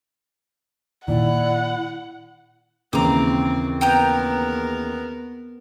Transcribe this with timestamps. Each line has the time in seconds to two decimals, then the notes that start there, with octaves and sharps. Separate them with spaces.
1.08 A#2 D#3 E4 D5 F#5
2.93 D#2 C#3 E3 C4 A#5 D6
3.81 B3 A#4 G5 A#5 G6